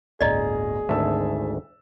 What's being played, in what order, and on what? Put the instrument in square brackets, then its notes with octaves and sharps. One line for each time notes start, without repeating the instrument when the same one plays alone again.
[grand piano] D1 G1 A#5 [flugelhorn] G#4 [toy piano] D5 D#5
[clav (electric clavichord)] G#1 D2 G#2 [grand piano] E5 A5 E6